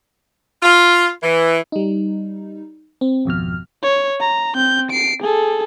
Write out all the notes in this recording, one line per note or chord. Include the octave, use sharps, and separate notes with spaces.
F4
E3
G3 D#4
C4
G#1 F2 B2 F6
C#5
A#5
C4 G6
C7 D7
G#4 A4